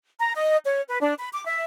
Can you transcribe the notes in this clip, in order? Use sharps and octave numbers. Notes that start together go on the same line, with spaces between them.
A#5
D#5
C#5
B4
D4
B5
D6
E5